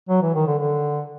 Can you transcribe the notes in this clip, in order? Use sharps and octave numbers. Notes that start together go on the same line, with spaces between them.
F#3
E3
D#3
D3
D3